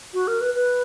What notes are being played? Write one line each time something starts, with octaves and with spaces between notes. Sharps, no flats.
F#4
A#4
B4
B4